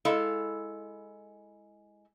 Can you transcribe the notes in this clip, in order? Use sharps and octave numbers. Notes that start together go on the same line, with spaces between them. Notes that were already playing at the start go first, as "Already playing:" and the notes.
G#3 E4 A4 F5